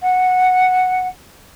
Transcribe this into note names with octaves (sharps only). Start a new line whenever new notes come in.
F#5